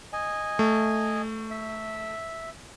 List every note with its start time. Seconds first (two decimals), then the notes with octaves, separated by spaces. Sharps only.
0.13 D#5 G#5
0.59 A3
1.51 E5